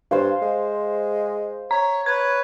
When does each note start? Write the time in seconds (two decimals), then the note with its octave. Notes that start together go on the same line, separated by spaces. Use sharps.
0.11 G2 C5 F5
0.42 G#3
1.71 C#5 A#5
2.06 B4 C#5 G#6